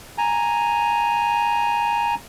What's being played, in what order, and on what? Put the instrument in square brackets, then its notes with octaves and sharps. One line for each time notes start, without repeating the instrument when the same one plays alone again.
[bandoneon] G#5 A#5